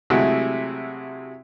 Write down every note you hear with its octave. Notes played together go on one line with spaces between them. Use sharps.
C3 F#3 G#3 A3 E4 F#5